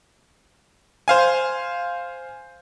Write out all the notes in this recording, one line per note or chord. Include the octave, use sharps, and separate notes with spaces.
C5 F5 G#5